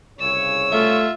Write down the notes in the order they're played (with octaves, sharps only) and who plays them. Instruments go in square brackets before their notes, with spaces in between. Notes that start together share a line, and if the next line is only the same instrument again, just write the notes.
[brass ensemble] C2 C#3 C#5 [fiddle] E6
[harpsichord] A3 [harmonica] F4 E5